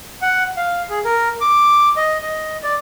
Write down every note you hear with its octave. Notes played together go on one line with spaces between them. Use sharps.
F#5
F5
G#4
A#4
D6
D#5
D#5
D5